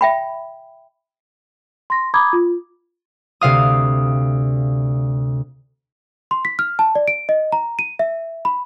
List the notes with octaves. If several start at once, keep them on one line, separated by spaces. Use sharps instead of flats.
E5 G5 B5
C6 A#6
A#5 B5 D6 D#6 G#6
F4
D2 C3 F5 D#6
C6
B6
F6
A5
D5
D7
D#5
A#5
D#7
E5
B5